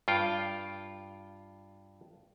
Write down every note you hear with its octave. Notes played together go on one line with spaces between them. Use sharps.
G2 F4 G5